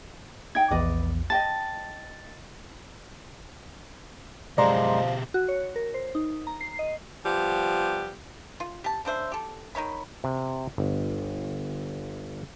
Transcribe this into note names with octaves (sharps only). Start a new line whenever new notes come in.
D#4 G5 G#6
A#1 E2 B4 D5 D#5
D#5 G5 A5 A6
F#2 B2 F3 G#3 G4 D5 A#5 C6
F#4
C#5
A#4
C5
D#4
A#5
C7
D#5
F3 G3 B3 G4
F4
G4 A5
C#3 D4 C5 E5
G4 A4
D#3 D#4 C#5 B5
C3
G1